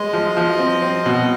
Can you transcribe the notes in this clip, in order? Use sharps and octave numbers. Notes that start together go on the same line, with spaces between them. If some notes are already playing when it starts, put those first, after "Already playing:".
Already playing: G#3 D#5
F3
F3
C4
C4
B2